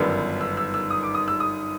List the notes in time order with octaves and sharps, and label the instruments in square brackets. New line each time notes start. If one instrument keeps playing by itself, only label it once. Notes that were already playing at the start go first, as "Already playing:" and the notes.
Already playing: [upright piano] G1 F#2 D#3 G3 B3
E6
E6
E6
D#6
D6
D#6
E6
D#6